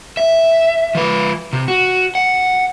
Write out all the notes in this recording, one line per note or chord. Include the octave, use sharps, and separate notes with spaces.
E5
F3 B4
C3
F#4
F#5